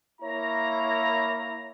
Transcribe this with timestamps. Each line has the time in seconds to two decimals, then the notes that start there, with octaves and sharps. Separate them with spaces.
0.21 A#3 E4 C#5 A#5